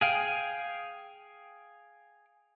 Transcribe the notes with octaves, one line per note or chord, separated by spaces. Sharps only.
G#4 F5 G5